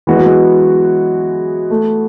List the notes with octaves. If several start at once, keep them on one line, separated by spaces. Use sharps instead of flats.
E3 G#3 B3 F#4
F#3
G#3
A3